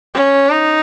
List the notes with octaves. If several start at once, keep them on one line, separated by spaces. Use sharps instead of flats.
C#4
D#4